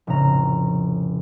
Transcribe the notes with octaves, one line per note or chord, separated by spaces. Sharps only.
F1 A2 C#3 A#5